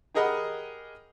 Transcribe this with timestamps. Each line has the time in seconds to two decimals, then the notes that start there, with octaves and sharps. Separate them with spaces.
0.15 G4 G#4 A#4 D#5 F#5 B5